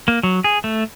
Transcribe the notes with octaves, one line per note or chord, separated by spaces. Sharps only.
A#3
F#3
G#4
A3